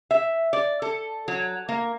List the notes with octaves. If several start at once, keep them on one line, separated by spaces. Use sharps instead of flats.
E5
D5
A4
F#3
A#3